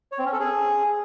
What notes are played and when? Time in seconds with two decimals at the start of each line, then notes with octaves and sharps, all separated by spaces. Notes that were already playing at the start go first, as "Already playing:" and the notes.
0.12 C#5
0.19 C4
0.26 C#4
0.33 A4
0.40 G#4